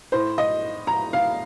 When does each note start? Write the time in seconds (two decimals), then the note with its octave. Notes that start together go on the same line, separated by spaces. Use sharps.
0.12 A2 C5
0.38 D#5
0.87 A#5
1.13 F5